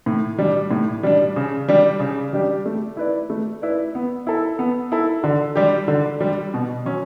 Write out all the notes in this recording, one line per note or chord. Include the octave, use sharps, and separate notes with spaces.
A2
G3 D4
A2
G3 D4
C#3
G3 D4 G4
C#3
G3 D4 G4
A3
E4 B4 D5
A3
E4 B4 D5
B3
E4 A4
B3
E4 A4
D3
G3 D4 G4
D3
G3 D4 G4
B2
F#3 C#4